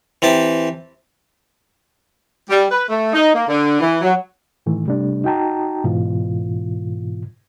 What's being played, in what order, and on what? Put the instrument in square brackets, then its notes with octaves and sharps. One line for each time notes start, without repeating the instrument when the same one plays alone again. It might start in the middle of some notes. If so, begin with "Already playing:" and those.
[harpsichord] E3 C4 G4 A5
[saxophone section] G3
B4
A3
D#4
A#3
D3
E3
F#3
[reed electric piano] A2 D#3 E3 A3
C3 G3 A3 D4
D#4 F#4 G5 A5 A#5
G#2 B2 E3 F4